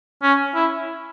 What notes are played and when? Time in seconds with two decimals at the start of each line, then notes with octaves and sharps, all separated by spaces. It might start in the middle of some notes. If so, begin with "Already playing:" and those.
0.23 C#4
0.55 E4